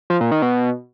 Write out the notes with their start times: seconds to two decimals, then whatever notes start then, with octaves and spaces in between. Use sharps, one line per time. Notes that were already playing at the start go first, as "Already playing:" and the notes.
0.10 F3
0.21 A#2
0.31 D#3
0.42 B2